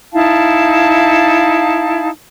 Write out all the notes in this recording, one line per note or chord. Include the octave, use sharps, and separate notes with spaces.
D#4 E4 F5 A5